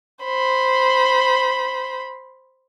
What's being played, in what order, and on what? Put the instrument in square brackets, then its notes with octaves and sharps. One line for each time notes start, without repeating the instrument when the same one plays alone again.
[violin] C5 B5